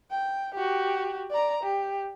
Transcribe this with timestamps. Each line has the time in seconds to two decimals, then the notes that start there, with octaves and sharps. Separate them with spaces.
0.11 G5
0.55 F#4 G4
1.31 D5 A#5
1.63 G4